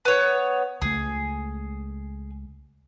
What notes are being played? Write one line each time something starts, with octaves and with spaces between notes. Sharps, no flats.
B3 C#5
C#2 A3 G#4